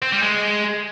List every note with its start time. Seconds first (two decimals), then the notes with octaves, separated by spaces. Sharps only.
0.02 C4
0.12 G3
0.22 G#3